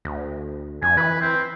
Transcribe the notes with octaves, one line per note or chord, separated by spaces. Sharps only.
D2
F2 G#5
E3 B4
C4